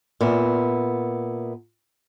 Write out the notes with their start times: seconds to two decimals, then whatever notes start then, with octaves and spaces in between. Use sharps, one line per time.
0.21 A#2 B3 E5